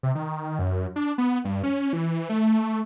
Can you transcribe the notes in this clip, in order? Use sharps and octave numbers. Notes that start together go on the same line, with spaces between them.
C3
D#3
F#2
D4
B3
G2
C#4
E3
A3